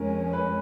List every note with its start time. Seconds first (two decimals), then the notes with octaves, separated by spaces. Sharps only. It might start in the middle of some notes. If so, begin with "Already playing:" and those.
Already playing: F2 F3 G#3 C#4 A#4
0.33 B4